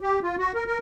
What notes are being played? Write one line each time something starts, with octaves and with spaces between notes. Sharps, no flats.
G4
F4
F#4
A#4
A#4